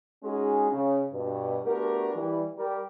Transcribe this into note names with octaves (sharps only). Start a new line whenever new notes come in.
G#3 C#4 D#4 F#4 G#4
C#3
G2 B2
A3 B3 D4 F#4 G4 A#4
E3 G3
G3 G4 A#4